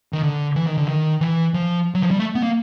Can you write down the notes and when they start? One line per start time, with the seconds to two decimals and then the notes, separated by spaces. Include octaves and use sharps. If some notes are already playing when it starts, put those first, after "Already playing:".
0.13 D#3
0.23 D3
0.56 E3
0.67 D#3
0.77 D3
0.88 D#3
1.21 E3
1.54 F3
1.94 F#3
2.03 F3
2.11 G3
2.19 A3
2.35 B3
2.43 A#3